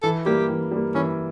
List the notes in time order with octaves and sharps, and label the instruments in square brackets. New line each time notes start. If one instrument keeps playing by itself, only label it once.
[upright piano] E3 [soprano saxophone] A4
[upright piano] G3 A#3 [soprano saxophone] G4
[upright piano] E3
G3 A#3
[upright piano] E3 [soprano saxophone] C#4